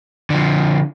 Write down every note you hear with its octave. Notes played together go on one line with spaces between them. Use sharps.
D3 F3